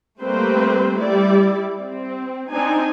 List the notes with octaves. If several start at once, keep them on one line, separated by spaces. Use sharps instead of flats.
G3 A3 A#3 C4 B4 C5
G3 E4 D5
C4
C4 D4 D#4 G#5